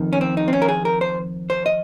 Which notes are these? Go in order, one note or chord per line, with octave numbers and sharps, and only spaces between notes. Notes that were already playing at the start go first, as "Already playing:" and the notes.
Already playing: F2 D#3
C#4
C4
D#4
C4
C#4
A#4
G#4
A#4
C5
C5
D#5